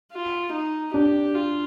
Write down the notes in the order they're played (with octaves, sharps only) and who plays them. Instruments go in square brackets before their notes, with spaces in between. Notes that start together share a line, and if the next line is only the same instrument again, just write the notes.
[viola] F4
D#4
[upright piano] D4 [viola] G4
[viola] F4